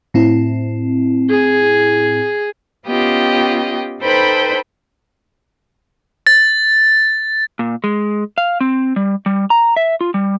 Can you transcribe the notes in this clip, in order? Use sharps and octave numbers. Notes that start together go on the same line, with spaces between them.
A2 C4 E4
G#4
B3 C#4 F4 G4 D#5 G5
D#4 A4 B4 C5 G5 B5
A6
A#2
G#3
F5
C4
G3
G3
A#5
E5
F4
G3